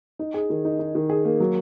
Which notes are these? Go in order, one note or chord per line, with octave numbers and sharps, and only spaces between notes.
D#4
G#4
D#3
D#4
D#4
D#3
G#4
A#3
F#3